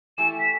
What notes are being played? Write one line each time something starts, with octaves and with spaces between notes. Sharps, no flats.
E3 A3 E4 G4 E7
B6